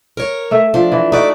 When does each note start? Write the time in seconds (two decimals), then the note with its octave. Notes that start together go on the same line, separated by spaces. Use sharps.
0.17 A#4 C#5
0.51 A3 E5
0.74 F3 D4
0.92 E3
1.12 A3 D#4 F#4 D5